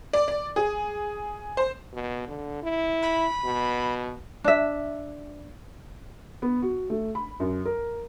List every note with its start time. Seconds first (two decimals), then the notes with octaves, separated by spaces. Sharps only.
0.13 D5
0.28 D5
0.56 G#4
1.57 C5
1.94 B2
2.28 D3
2.63 E4
3.02 B5
3.44 B2
4.44 D4 E5
6.42 B3
6.62 F#4
6.90 A3
7.15 B5
7.40 F#2
7.65 A#4